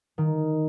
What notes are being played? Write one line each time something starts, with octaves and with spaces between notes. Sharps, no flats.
D#3